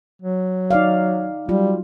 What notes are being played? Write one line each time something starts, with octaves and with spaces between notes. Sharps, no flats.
F#3
D#4 D5 F5
F#3 G3 F4